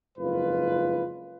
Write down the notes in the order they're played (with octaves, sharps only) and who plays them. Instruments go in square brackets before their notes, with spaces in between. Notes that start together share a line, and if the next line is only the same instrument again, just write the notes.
[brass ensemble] F#1 F2 G#2 F4 B4